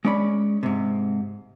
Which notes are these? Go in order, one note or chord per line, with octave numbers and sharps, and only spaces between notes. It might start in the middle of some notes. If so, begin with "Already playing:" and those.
G#3 C#4 D5 B5
G#2 C3